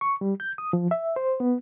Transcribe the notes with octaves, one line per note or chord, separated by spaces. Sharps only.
C#6
G3
G6
D#6
F3
E5
C5
B3